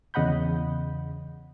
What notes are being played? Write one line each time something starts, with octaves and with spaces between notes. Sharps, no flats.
E2 C#3 D#5 F#5 B5 G6